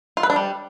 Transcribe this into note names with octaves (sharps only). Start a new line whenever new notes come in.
F4
B4
D4
G3